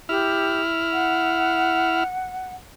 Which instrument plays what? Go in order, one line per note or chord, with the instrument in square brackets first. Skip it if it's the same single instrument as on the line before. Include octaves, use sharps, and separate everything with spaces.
[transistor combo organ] E4 F6 [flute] G4
[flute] F#5